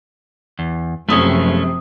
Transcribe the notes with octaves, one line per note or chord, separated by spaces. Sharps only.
E2
F#1 C3 F3 A3 C#4 D#6